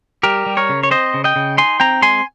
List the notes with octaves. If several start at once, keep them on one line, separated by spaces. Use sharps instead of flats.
G3 G4 A#4
G3
A#4 C#5
C#3
C#5
C4 C5 D#5
C#3
D#5 G5
C#3
D#4 G#5 C6
C4 G5 A#5
G#3 G#5 C6